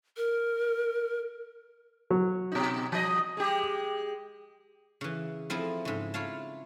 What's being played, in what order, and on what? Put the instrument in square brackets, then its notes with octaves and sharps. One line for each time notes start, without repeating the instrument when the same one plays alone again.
[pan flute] A#4
[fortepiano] F#3
[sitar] B2 D#4
F3 D#5
G#3 G4
[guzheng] C#3 E3
F3 C4 E4 A4 D#5
G#2 C#3
E4 F4 C#5 F5 A5